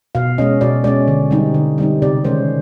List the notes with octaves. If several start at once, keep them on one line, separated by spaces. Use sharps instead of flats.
B2 F5
G#3 C#4 D#5
B2 D5
G#3 C#4 D5
D3
G3 C4 D#4
D3
G3 C4 D#4
C3 D5
D#3 G#3 C#4 C5